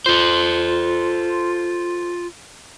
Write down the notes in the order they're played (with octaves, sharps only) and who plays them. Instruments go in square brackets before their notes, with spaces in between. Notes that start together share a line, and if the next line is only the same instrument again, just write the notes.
[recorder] F4 [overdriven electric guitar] A4 C5